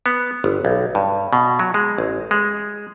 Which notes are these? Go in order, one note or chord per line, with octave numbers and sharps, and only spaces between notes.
B3
G1
B1
G2
B2
F#3
G#3
A1
G#3